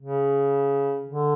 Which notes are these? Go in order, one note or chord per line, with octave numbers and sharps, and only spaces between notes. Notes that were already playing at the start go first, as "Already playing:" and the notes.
C#3
D3